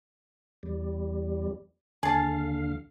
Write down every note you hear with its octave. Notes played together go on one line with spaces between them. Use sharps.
E2 G3
D#2 D3 G#4 F5 A5